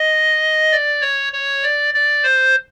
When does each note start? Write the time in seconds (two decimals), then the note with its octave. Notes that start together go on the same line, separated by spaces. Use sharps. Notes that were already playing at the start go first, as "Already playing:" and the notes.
Already playing: D#5
0.71 D5
1.01 C#5
1.33 C#5
1.63 D5
1.94 D5
2.24 C5